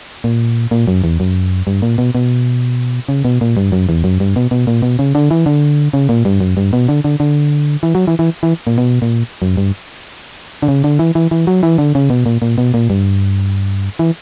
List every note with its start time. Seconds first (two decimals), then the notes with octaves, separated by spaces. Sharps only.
0.24 A#2
0.71 A#2
0.88 F#2
1.04 E2
1.20 F#2
1.67 G2
1.82 A#2
1.98 B2
2.15 B2
3.09 C#3
3.25 B2
3.41 A#2
3.57 G2
3.72 F#2
3.89 E2
4.04 F#2
4.20 G2
4.36 B2
4.51 B2
4.67 A#2
4.82 B2
4.99 C#3
5.15 D3
5.31 E3
5.46 D3
5.93 C#3
6.09 A#2
6.25 G2
6.40 F#2
6.57 G2
6.73 B2
6.88 D3
7.04 D3
7.20 D3
7.83 E3
7.95 F#3
8.07 E3
8.19 E3
8.43 E3
8.67 A#2
8.78 B2
9.02 A#2
9.42 F#2
9.57 G2
10.62 D3
10.68 C#3
10.84 D3
10.99 E3
11.15 E3
11.31 E3
11.47 F#3
11.63 E3
11.78 D3
11.95 C#3
12.10 B2
12.26 A#2
12.42 A#2
12.58 B2
12.74 A#2
12.90 G2
13.99 E3